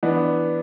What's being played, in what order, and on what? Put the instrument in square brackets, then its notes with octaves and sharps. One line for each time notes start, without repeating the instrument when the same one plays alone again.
[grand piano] E3 B3 D4